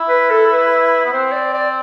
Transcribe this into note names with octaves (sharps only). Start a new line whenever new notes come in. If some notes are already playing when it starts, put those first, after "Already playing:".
Already playing: E4
B4
A4
A4
B4
B3
C4 C5
D5
D5